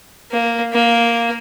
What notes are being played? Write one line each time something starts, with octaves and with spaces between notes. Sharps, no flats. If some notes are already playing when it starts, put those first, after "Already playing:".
A#3
A#3